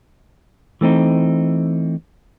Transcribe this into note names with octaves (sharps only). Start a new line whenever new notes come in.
E3 A3 C4 D#4